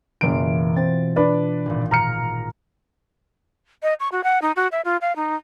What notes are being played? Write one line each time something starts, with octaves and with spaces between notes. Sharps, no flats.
F#1 B2 E3 F4 D7
C4 A6
D4 B4 D5
G#1 A#2
A#5 F6 C#7
D#5
C#6
F#4
F#5
D#4
F#4
E5
F4
F5
D#4